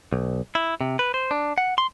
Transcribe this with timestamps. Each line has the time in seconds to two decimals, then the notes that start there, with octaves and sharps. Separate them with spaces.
0.13 B1
0.55 E4
0.81 C3
0.99 B4
1.14 C5
1.31 D4
1.58 F#5
1.78 C6